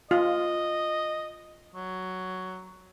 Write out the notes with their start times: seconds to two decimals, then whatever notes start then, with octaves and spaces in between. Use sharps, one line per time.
0.11 F4 D#5
1.75 F#3